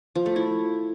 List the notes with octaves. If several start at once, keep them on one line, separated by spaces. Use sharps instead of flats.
F3
A3
E4